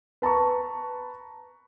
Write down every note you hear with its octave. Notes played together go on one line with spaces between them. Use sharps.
B4 A5 A#5 C#6